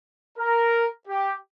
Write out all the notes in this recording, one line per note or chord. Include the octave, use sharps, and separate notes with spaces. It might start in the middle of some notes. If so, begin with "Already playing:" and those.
A#4
G4